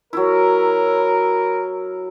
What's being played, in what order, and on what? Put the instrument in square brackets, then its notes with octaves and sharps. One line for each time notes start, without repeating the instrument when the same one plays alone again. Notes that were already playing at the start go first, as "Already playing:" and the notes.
[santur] F#3 E4 [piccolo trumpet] A#4